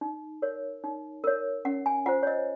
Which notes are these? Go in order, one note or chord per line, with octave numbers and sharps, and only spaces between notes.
D#4
A#4 C#5
D#4
A#4 C#5
C#4 F#5
G#5
F4 C5 F#5
C#5
D#5